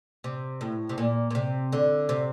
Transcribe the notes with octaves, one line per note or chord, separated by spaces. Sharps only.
C3
A2
C3
A#2
A#2
C3
D3
C3